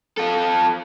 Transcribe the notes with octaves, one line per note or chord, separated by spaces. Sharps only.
F4 A4